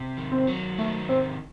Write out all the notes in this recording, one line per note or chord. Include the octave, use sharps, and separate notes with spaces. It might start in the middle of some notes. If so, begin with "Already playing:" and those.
Already playing: C3
D#3
C4
F#3
D#3 A3
C3 C4